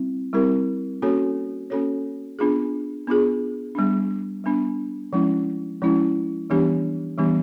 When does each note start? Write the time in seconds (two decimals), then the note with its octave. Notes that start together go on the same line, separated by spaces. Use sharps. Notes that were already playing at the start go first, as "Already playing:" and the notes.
Already playing: G3 C4 E4
0.33 G3 C4 E4 G4 A#4
1.02 A#3 C#4 F#4 A4 C#5
1.70 A#3 C#4 F#4 A4 C#5
2.39 B3 D4 F4 G#4
3.07 B3 D4 F4 G#4
3.75 G3 B3 D4
4.44 G3 B3 D4
5.13 F3 G#3 C#4 E4
5.82 F3 G#3 C#4 E4
6.50 E3 G3 B3 D4 G4
7.18 E3 G3 B3 D4 G4